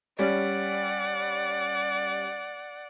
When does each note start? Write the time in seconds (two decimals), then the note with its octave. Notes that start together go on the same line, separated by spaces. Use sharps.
0.19 G3 C#4 D5 F#5